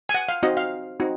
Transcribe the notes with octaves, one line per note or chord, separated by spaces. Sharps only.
G#5
F#5
F5
C4 D#4 F#4 D#5
F5
C4 D#4 F#4